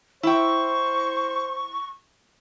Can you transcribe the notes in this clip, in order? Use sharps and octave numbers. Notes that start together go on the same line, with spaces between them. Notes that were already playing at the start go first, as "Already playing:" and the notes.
E4 C5 G5 C#6